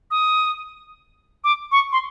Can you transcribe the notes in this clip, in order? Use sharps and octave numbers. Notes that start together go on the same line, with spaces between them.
D#6
D6
C#6
C6